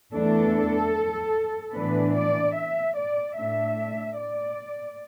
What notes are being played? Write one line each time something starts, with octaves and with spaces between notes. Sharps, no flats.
E2 E3 A3 D4 A4
A2 E3 B3 D4 B4
D5
E5
D5
A2 A3 D4 E5
D5